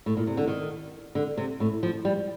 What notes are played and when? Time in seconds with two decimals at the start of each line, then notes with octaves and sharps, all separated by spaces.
0.06 A2
0.17 A#2
0.27 C3
0.37 D3
0.47 D#3
1.15 D3
1.37 C3
1.60 A2
1.83 F3
2.05 G3